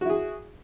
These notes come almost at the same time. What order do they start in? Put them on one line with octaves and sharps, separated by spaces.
F#4 E4 G#4